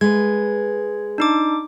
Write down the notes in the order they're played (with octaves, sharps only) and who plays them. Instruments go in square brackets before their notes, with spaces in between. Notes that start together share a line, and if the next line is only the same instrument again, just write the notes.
[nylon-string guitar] G#3 B4 [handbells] G#6
[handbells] D4 D#4 D6